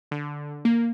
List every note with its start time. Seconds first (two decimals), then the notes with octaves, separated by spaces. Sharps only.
0.11 D3
0.65 A#3